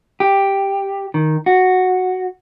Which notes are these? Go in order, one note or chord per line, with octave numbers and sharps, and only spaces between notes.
G4
D#3
F#4